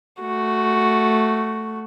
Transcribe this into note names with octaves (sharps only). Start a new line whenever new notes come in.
A3 F#4